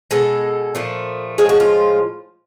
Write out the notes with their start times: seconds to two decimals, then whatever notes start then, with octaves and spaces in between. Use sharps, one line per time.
0.11 B2 G#3 A4
0.75 A#2 F3 A3
1.38 A2 F3 G#3 G#4
1.49 F#4
1.60 F4